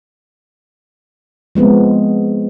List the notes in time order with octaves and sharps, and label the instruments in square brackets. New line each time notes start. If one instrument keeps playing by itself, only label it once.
[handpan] F3 G#3 B3 C4